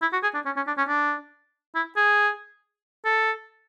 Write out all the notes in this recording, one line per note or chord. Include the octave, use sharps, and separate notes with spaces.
E4
F#4
G#4
D4
C#4
C#4
D4
C#4
D4
E4
G#4
A4